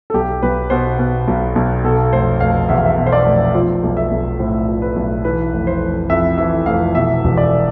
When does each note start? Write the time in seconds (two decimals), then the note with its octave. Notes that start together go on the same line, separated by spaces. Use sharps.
0.10 A4
0.14 B1 G4
0.42 B1 B4
0.70 B2 C5
0.99 B2
1.27 B1
1.55 B1
1.84 B2 A4
2.13 F1 C5
2.40 F1 F5
2.69 E2 E5
2.77 F5
2.86 E5
2.98 B2
3.06 C5
3.12 D5
3.26 F1
3.54 F3 C5
3.83 B1
3.97 E5
4.11 B1
4.39 A2 C5
4.68 F3
4.82 B4
4.96 B1
5.24 E3 B4
5.53 F1
5.67 C5
5.81 F1
6.10 F2 E5
6.38 E3 E5
6.66 F1 F5
6.95 B2 E5
7.24 E1
7.37 D5